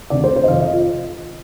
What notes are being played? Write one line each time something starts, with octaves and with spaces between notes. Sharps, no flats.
D2 C3 D#3 D5
C5
C5
D#5
F2 C3 D#3 F5
D#5
F4